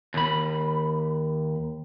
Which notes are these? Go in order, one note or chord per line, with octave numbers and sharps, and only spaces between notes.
D#2 B5